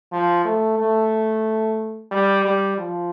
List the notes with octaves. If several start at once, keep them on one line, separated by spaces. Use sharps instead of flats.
F3
A3
A3
G3
G3
F3